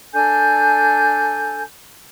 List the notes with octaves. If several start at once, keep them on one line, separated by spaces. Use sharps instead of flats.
D4 A4 G#5 G6